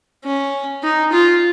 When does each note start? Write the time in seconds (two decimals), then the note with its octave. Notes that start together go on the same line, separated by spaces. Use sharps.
0.25 C#4
0.83 D#4
1.12 F4